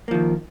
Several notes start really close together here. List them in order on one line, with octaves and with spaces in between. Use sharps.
A#3 F3 D#3